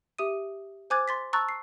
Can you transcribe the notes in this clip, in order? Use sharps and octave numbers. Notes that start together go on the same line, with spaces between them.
G4 E5 D#6 D#7
C5 G#5 D6 F#6 G#6 A6
C6 A6 B6
A5 A#5 C#6 E6 F#6 A6
C7